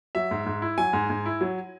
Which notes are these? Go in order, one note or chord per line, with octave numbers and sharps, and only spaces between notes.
F#3 E5
G#2
G#2
E4
F#3 G#5
G#2
G#2
E4
F#3